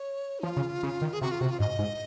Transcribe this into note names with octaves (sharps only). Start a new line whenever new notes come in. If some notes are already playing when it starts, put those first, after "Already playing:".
Already playing: C#5
D#4
F3 F4
C#3
C#3
D#3
G#4
C3 F#4
F4
C3 F#4
F4
G#2 D#5
G#2